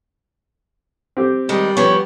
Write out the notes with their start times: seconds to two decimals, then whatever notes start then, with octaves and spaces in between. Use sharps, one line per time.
1.17 C4 G4
1.49 D#3 G3 G#3
1.77 F3 B3 C#4 C#5